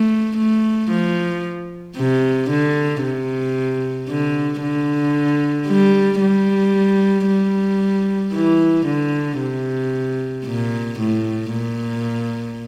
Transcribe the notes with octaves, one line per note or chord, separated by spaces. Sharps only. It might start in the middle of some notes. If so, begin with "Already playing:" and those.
Already playing: A3
A3
F3
C3
D3
C3
D3
D3
G3
G3
G3
E3
D3
C3
A#2
A2
A#2